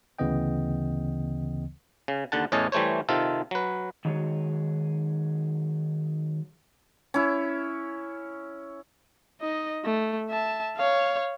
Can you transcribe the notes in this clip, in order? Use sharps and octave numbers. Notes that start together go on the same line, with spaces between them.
D2 C#3 E3 B3 D#5 G5
C#3
D#2 D3 F#5 A5
E2 A2 C#4 C#5 D#5 A5
E3 G3 A3 C5 C#5
C3 D#3 F4 A4
F#3 B4
D#3 F#3 G#3 D#4 F#4 C#5
C#4 E4
D#4 D#5
A3
E5 A5
C#5 F5